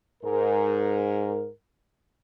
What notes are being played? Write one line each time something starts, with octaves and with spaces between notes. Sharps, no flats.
G#2 A#4